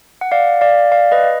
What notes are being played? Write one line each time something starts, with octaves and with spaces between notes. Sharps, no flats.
F#5
D5 F5
D5 F5
D5 F5
B4 D#5